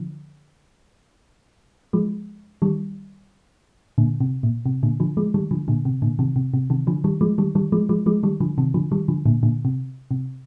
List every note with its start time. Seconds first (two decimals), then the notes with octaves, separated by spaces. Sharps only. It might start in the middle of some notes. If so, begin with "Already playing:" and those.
Already playing: D3 F3
1.93 F3 G#3
2.62 D#3 G3
3.98 A#2 D3
4.21 C3
4.43 A#2
4.66 C3
4.83 A#2 D3
5.00 D3 F3
5.17 F3 G#3
5.34 D#3 G3
5.51 D3 F3
5.68 A#2 D3
5.85 C3
6.02 A#2 D3
6.19 C3 D#3
6.36 C3
6.54 C3
6.70 C3 D#3
6.87 D3 F3
7.04 D#3 G3
7.21 F3 G#3
7.38 D#3 G3
7.55 D#3 G3
7.72 F3 G#3
7.89 F3 G#3
8.06 F3 G#3
8.23 D#3 G3
8.40 D3 F3
8.58 C3 D#3
8.74 D3 F3
8.92 D#3 G3
9.08 D3 F3
9.26 A#2 D3
9.43 A#2 D3
9.65 C3
10.11 C3